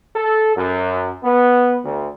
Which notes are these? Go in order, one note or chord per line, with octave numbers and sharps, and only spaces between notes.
A4
F#2
B3
D2